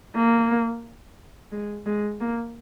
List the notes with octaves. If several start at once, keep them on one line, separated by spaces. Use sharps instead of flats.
A#3
G#3
G#3
A#3